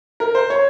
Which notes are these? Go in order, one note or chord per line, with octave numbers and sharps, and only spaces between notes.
A#4
C5
C#5